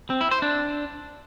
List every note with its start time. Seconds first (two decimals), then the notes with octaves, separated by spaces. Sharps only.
0.10 C4
0.21 E4
0.31 C5
0.42 D4